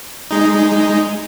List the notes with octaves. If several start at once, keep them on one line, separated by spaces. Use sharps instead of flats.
G#3 D#4